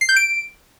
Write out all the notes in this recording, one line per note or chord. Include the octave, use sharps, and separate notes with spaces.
C7
G6
D7